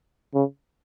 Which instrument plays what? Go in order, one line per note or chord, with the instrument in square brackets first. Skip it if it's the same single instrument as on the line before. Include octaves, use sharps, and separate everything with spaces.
[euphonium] C#3